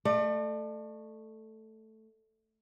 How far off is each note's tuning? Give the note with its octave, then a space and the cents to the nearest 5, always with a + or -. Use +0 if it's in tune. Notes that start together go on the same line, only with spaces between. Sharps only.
A3 +0 D5 +40